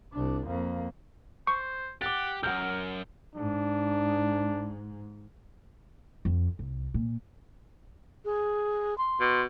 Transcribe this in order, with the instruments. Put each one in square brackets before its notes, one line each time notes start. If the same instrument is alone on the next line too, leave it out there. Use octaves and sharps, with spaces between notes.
[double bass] C2 D4
F2 A#3
[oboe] C5 [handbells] C#6
[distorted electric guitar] G4 [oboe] F#5 [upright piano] D6 A6
[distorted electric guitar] B1 F#2 [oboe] A#4 [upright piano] F#5 G6
[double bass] G#2 [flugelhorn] D4
[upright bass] F2
C2
A#2
[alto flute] G#4
C6
[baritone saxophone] B2